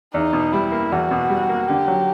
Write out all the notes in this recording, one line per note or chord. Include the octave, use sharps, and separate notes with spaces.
E2 D#4
B2
G3 E4
A#3
E2 F#4
B2
G3
A#3
D3 G4
F#3